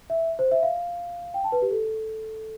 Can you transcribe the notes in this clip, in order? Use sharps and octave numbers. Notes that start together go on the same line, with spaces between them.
E5
C5
E5
F5
G5
A5
B4
G4
A4